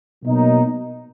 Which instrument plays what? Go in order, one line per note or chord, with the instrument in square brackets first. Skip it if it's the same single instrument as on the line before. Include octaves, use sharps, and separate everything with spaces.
[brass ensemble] B2 F#3 A#3 D#4